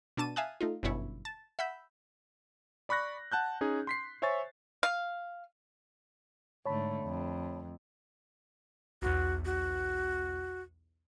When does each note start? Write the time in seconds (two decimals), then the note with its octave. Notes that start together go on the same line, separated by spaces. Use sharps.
0.17 B2 D4 A5 D#7
0.36 E5 F5 G#5 A5 D#6 F#6
0.61 A3 D#4 F4
0.83 G1 F#2 B2 E4 C#5
1.25 A5
1.59 E5 F#5 B5 E6 G6
2.89 D5 B5 C#6 F#6 A#6
3.32 F#5 A5 F#6 G6
3.61 C#4 D#4 G#4
3.87 C6 B6 C7
4.22 C5 C#5 E5 G#5 C#6 A6
4.83 F5
6.66 G#2 D3 A3 C#5 A5 B5
7.03 F2
9.02 B1 E2 F#4
9.45 F#4